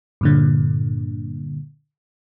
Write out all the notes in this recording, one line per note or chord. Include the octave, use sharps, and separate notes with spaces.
G2 A#2 D3